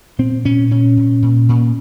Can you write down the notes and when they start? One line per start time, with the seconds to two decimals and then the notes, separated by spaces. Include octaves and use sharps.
0.19 A#2 C4
0.45 A#2 C#4
0.71 A#2 C#4
0.97 A#2
1.22 A#2
1.49 A#2